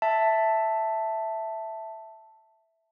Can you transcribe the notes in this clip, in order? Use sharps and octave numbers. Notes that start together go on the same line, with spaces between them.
E5 A5